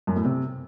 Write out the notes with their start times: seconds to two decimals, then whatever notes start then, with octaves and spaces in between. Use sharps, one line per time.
0.07 F#2
0.16 A2
0.25 C3